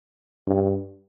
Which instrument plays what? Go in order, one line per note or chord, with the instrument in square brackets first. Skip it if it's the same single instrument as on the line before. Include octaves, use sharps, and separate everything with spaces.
[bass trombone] G2